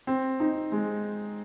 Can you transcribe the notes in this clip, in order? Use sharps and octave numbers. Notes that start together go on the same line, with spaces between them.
C4
D#4
G#3